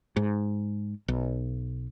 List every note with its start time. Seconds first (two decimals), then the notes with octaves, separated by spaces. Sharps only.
0.16 G#2
1.08 B1